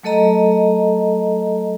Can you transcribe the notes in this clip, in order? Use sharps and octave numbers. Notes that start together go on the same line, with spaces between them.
F#3 A3 A4 D#5 A#5